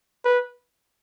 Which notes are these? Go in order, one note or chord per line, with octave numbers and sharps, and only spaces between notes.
B4